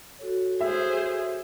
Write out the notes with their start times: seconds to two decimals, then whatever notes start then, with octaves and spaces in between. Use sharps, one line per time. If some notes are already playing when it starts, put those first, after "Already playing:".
0.19 F#4 A4 C#5
0.61 G#4 C5 E5